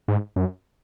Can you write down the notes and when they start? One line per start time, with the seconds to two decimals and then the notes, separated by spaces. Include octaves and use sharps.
0.08 G#2
0.36 F#2